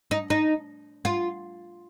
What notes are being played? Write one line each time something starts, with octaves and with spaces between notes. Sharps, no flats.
D#4
D#4
F4